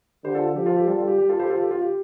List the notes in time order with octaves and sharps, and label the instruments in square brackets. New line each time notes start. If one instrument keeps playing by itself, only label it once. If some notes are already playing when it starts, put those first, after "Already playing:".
[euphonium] D3 [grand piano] G4 C5
[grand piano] F4 A4
[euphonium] F3 [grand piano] G4
[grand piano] F4 A4
G4
[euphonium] G3 [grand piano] F4 A4
[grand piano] F4
G4
G4
F4 A4
G4 C5
F4 A4
G4
F4
G4